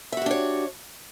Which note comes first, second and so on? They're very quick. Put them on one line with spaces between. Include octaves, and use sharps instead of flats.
E5 F#4 G4 D4 C#5